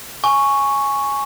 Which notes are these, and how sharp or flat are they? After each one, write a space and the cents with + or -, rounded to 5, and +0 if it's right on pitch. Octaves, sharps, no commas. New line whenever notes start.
G#5 +0 C#6 +0